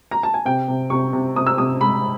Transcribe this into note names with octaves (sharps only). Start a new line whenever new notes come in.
A#5
A5
G#5
C3 G5
C3
C3 C#6
C3
C3 D#6
E6
C3 D#6
G#3 B5